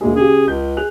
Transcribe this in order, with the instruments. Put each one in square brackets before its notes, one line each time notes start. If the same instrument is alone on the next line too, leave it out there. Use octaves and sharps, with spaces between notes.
[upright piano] D2 A#2 G#4 [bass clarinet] G#3
[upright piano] C#3 G4 [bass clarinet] G#4
[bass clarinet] C#2 [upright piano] G6
[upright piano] G#4 F#6 F7